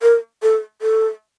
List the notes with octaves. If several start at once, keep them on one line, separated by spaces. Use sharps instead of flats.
A#4
A4
A4